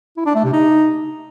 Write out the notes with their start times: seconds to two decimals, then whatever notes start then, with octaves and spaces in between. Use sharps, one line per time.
0.17 E4
0.26 D4
0.35 A3
0.44 C3
0.53 D#4